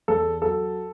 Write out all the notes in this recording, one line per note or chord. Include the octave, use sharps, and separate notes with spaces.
E2 A4
F#3 A4